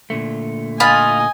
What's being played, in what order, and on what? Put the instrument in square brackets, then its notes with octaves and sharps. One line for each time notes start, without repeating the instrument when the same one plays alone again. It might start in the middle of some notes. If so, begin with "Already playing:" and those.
[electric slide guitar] A#2 D3 A3
[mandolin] F4 B5 [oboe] D#5 [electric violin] G#5